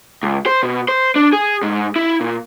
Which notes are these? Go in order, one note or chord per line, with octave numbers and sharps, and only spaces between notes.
C#2
C5
B2
C5
D4
G#4
G#2
E4
A#2